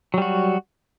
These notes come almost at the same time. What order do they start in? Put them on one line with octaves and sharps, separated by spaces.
F#3 G3 F#4